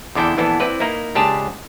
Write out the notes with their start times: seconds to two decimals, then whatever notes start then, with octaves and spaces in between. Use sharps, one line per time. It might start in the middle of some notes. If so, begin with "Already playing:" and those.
0.15 E2 D3 D4 E4 A4 G5
0.37 A#1 E3 B3 D4 E4 A4
0.60 C4 E4 B4 D5
0.80 A#3 D#4 E4
1.15 C#2 D4 G4 G#4 A5